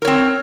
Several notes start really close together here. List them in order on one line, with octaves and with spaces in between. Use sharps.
A#4 C#5 C4